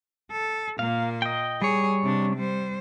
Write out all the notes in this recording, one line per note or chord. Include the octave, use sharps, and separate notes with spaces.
A4
A#2 A#3 F5
D#5 G5
G3 G#4 C#5
C3 D4
G3 C5